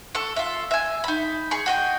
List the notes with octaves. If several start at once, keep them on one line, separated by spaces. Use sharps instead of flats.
A4 C#6
F4 E5
E5 G#5
D#4 B5
G#4 C#6
F#4 D#5 G5